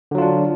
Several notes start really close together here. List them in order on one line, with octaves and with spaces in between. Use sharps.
D3 F#3 F4 D4